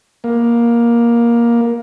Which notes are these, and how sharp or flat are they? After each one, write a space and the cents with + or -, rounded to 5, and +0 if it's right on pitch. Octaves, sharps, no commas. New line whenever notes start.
A#3 +15